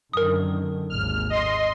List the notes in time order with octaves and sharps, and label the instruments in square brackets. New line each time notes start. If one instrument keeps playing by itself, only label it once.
[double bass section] F#2 D3 D#3 [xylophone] A#4 D#6
[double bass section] G#1 D#2 [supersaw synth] F6
[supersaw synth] D#5 C6